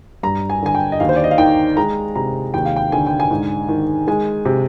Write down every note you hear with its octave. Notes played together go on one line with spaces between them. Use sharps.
G2 A#5
G#5
D3 G#5
G5
D#5
D#2 F5
C5
D5
D#5
F5
D#3 G5
G#3 A#5
C3 A#5
D#2 G5
F5
G5
D3 G#5
G5
G#5
G#2
D#3
G#3 G#5
C3